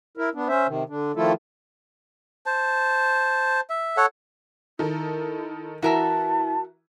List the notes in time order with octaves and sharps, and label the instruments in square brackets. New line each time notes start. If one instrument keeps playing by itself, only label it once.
[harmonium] E4 A#4
B3 D4
C#4 C5 E5
C3 D#3
D3 D4
D#3 F3 A3 E4 F4 A4
[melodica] C5 A5
E5
A4 C#5 F#5
[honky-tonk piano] D#3 A4 A#4 [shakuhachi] E4
[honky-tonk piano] E3 E4 [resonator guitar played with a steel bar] F#4 A#4 E5 [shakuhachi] A5